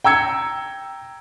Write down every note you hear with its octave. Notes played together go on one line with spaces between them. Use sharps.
G5 A#5 E6 G#6 C#7